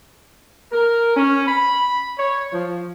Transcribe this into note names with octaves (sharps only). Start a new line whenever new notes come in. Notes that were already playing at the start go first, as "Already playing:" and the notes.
A#4
C#4
B5
C#5
F3